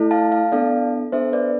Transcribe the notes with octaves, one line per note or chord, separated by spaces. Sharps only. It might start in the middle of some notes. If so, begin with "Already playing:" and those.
Already playing: A3 E4 A4
F5 A5
F5 A5
B3 D4 A4 D5 F5
B3 D4 A4 C5 E5
B4 D5